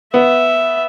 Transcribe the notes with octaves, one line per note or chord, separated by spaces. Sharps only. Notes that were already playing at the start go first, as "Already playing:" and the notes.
B3 E5